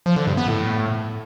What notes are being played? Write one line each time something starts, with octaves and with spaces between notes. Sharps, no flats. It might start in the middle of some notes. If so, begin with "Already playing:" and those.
F3
D3
G2
B3
A2